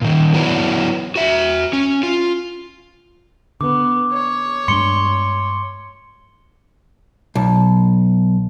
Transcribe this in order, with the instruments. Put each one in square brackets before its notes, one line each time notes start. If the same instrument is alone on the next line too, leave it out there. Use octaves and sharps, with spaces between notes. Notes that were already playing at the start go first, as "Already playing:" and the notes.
[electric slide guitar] A#2 D#3
F#3 B3 E4 B4 C#5 D5
F#4 E5
C#4
F4
[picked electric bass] D3 [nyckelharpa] B3 [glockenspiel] D6
[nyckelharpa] C#5
[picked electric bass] G2 G#3 D4 [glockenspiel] C6 C#7 G7
[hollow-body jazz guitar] B1